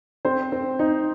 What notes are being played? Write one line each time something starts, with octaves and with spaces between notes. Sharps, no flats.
C4 C5
C4
D#4